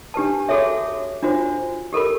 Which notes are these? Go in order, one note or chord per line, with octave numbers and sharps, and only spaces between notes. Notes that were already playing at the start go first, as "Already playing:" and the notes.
D4 G4 B4 A5
F#4 G#4 A4 C#5 E5
D4 F4 F#4 C5
G4 A4 A#4 B5